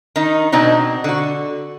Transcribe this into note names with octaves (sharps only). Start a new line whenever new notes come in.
D#3 D#4
B2 C4 D4 D#4
D3 F#4